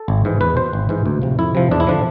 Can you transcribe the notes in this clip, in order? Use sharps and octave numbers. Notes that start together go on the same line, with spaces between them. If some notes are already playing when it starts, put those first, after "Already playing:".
Already playing: A4
G#1
G#2 E3
E2 B4
B2 C5
G#1
G#2 E3
D2
C3 F3
F2 E4
C3 F3
E2 D4
E4
D3 F3 D4